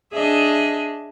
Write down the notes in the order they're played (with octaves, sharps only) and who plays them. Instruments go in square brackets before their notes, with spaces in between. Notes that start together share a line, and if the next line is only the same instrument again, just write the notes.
[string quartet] D4 G#4 D#5 E5